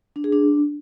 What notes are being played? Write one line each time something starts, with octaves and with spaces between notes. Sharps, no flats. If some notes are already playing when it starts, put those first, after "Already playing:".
D4
G#4
D4